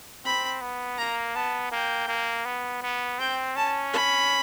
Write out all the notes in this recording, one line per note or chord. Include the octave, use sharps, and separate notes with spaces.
C4 B5
B3
A#3 A#5
B3 A5
A#3 G5
A#3
B3
B3
C4 G5
C#4 A5
B5